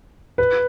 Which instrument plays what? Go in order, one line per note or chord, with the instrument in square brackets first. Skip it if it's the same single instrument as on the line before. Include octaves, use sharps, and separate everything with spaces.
[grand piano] B4